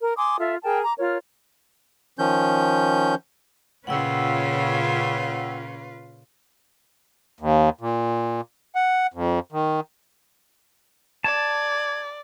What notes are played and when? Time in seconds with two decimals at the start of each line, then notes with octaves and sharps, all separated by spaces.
0.01 A#4
0.16 G#5 C6 D6 D#6
0.38 F4 A4 E5
0.62 G#4 A#4 G5 A5
0.82 A#5 D6
0.97 F4 A#4 C#5
2.19 D#3 F3 C#4 G6
3.87 A#2 C#3 C#4 F4 B4 F#5 G5 E6
7.40 D#2
7.81 A#2
8.75 F#5
9.14 F2
9.52 D#3
11.24 D5 A5 G#6